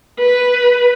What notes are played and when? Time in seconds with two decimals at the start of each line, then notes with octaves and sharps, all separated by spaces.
0.20 B4